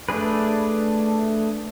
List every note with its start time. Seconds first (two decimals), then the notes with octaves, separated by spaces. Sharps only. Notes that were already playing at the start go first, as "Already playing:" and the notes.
0.09 A3 D4 G#4 B4